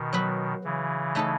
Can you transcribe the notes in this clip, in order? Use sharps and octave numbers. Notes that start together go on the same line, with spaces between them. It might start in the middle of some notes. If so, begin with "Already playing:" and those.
Already playing: B2 D#3
F#3 B3 F#4 B4
C#3 E3
A3 D#4 A4 C#5